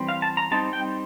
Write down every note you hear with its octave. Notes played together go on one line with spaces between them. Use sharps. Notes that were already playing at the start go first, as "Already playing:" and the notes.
Already playing: E3 G3 C4
F5
A5
A#5
G3 C4 D#4 A5
G5